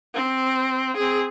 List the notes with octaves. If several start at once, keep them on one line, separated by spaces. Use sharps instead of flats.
C4
C4 G#4